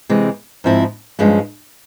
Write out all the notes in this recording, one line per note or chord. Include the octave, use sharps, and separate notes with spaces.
C3 E3 G#3 C4
G#2 F3 C4 E4
G2 F3 G#3 C#4